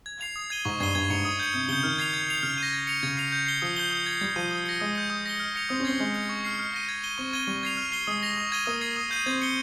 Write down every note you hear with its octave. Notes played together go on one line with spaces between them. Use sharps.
G#6
C7 F7
D#6
G#6 D#7 G7
G#2 C#6
G2 G#6 C7 D#7 G7
G2 G#6
G#2 C#7 F7
D#6
G6 C#7
C3 D#6
C#3 G6 C#7 G7
D#3 F6
G#6 C7 F7
G#6
C7 F7
C#3 F6
A#6 D#7
G#6
C#7 F7
C#3 G#6
C7 F7
G6
C7 G7
F3 D#6
G6 C7 G7
D#6
G#6 C7
G3 G#6
F3 C7 D#7
D#6
A#6 C#7
G#3 D#6
G6 C#7
D#6
A#6 C#7 G7
F6
A#6 C#7 F7
C4 D#6
C#4
C4 G#6 C7 G7
G#3 G6
C#7 F7
C#6
F6 C7
F6
A#6 D#7
G#6
D#7 G7
C4 C#6
G#6 D#7 G7
G3 C#6
G#6 C7 F7
F6
C7 G7
G#3 D#6
A#6 F7
C#6
G#6 D#7 G7
A#3 D#6
G#6 C7
D#6
G6 C7 D#7
C4 G#6
C#7 G7